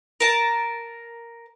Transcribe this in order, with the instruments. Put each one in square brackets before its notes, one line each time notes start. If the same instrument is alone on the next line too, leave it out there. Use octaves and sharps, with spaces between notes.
[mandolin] A#4 A5